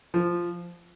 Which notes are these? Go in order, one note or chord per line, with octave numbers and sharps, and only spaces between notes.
F3